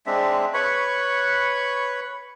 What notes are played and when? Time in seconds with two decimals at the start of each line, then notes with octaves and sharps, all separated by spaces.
0.06 G#3 C4 D4 E5
0.54 B4 C#5 B5 C#6